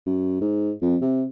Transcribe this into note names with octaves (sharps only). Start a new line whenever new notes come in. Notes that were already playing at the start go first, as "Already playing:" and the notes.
F#2
G#2
F2
C3